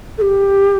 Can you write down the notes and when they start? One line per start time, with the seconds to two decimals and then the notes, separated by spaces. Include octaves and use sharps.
0.18 A4
0.22 G4